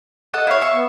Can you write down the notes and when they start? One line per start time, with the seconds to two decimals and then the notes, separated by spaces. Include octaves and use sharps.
0.34 A4 D#5 F#5
0.47 E4 C#5 F5
0.61 E5 C#6
0.74 B3